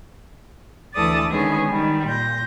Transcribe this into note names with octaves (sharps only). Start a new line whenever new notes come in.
D2 E3 A4 D5 D#6 A6
D3 D#3 G#3 B3 C#4 G#4
D#3 G3
A#2 G6 A#6